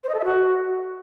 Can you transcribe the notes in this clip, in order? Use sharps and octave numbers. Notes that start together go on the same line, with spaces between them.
C5
D#5
A4
E5
F#4